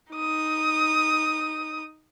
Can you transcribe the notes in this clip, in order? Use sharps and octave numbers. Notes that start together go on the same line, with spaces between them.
D#4 D#6